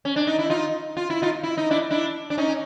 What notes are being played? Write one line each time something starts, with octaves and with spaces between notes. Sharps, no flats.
C#4
D4
D#4
E4
D#4 F4
F4
E4
D#4 F4
E4
D#4
D4 E4
D4 E4
D4
C#4 D#4